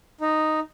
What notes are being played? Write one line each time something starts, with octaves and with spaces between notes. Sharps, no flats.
D#4